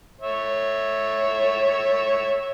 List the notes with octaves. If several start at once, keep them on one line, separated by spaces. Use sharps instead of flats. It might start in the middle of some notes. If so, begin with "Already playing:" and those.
C#5 E5